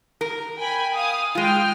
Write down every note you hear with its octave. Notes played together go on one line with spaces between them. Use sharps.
A#4
G5 G#5 B5
F5 D#6
G#3 F4 G5 F6